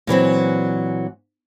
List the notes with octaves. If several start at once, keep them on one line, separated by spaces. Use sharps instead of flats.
A#2 E3 F#3 C4